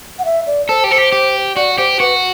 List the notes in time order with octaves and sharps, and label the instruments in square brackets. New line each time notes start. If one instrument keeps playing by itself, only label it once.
[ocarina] F#5
E5
D5
[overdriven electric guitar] A4 [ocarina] C5
[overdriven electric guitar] G4
[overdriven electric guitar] A4 [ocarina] C5
[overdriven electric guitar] G4
G4
[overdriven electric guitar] F#4 [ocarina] D5
[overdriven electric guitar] G4 [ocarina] C5
[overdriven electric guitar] F#4 [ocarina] B4